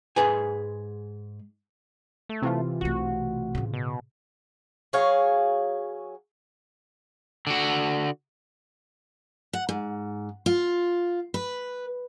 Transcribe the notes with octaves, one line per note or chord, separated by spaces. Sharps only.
G#2 G#4 B4 G#5
A3
C3 E3 F4
B1 A3 F#4
A2 C#3
B2
F#3 G#4 C#5 F5
D3 F#4
F#5
G#2
F4
B4